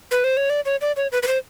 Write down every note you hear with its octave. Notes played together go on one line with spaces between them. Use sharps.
B4
C5
C#5
D5
C#5
D5
C#5
B4
B4
C5